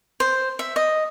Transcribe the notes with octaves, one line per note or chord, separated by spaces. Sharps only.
C5
E5
D#5